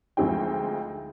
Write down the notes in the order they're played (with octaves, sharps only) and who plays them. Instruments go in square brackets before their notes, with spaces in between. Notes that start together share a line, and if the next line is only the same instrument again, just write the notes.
[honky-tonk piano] D2 F3 G#3 C4 D#4 G5